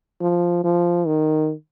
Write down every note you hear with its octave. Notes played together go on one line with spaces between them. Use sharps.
F3
F3
D#3